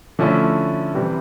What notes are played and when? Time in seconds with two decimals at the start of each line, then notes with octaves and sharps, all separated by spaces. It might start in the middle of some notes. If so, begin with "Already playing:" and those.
0.19 D3 F3 A3 C#4 E4
0.94 C3 E3 G3 C4